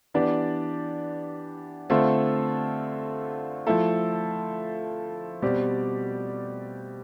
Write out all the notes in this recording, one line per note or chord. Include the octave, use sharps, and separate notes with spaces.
E3 B3 D4 G4 D5
D3 A3 C4 F4 A4
F3 A3 E4 A4
B2 G3 C4 G4 D5